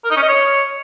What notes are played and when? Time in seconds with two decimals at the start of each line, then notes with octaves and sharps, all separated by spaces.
0.04 A#4
0.10 D#4
0.16 C#4
0.22 D#5
0.28 C#5